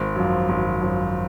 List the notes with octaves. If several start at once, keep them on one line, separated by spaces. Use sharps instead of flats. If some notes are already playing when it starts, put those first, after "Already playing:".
Already playing: G#1
F#2 F3
G#1
F#2 F3